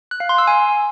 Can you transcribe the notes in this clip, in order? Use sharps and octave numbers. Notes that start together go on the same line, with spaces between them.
F#6
F5
C6
E6
G#5